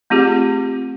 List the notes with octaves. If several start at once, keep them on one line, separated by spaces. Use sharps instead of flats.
A3 C4 F4 G4 G#4